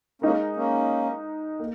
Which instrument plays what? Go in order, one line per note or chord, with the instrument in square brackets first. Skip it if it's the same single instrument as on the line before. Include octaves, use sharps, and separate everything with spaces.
[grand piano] G#3 D#4 A#4 [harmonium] A#3 C#4
[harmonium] A#3 C#4
[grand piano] A#3